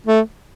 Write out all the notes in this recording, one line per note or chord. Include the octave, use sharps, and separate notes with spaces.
A3